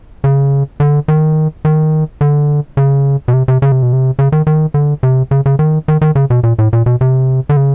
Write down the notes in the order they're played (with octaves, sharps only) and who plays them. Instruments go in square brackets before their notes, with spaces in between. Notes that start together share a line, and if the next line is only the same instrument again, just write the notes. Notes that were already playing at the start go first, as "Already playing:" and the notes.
[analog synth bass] C#3
D3
D#3
D#3
D3
C#3
B2
C3
C3
C#3
C3
B2
C3
C#3
D#3
D#3
D3
C3
C#3
C#3
D#3
D#3
D#3
C#3
B2
A#2
A2
A#2
B2
C3
D3
C#3